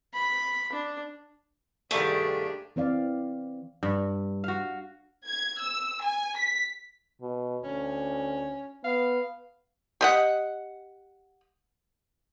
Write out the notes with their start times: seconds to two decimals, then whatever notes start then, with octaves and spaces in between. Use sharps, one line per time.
0.13 B5
0.72 D4
1.91 C2 G2 D#3 A3 D4 G4 G#4
2.76 E3 C4 D5 F5
3.83 G2
4.44 F#4 F5
5.27 G#6
5.61 E6
6.04 G#5
6.37 B6
7.21 B2
7.63 D2 C#4
8.84 B3 F5
10.01 G4 D#5 F#5